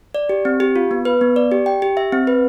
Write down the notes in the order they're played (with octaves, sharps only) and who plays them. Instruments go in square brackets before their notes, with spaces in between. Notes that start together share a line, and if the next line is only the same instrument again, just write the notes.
[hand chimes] D5
G4
C4
G4
F4
B3
B4
B3
D5
G4
G5
G4
E5
C4
B4